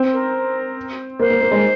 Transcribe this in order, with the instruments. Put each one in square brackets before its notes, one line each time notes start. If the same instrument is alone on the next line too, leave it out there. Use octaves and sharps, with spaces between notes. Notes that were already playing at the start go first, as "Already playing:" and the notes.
Already playing: [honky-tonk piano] C4
[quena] A#4
[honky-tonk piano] A#3 [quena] C5
[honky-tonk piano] A#3
A#3
G#3